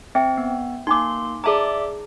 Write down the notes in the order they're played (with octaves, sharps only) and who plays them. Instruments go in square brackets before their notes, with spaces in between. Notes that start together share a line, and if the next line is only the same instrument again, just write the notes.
[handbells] C4 [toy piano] E5 G5
[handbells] B3
[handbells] A#3 C6 [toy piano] D#4 G#5 D6
[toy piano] G#4 A5 A#5 [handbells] D5 E5 D6